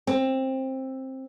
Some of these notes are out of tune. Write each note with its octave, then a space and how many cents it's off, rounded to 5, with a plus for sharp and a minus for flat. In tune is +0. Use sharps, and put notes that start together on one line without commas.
C4 +15